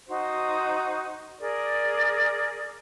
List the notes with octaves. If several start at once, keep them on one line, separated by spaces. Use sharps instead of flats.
D#4 F#4 C5
G#4 A#4 D5